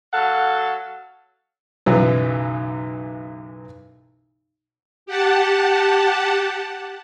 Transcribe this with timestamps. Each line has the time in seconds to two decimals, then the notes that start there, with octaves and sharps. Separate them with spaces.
0.13 F#3 A4 F5 F#5
1.86 B1 F#2 C#3 E3 F#3
5.06 G4 F#5 A5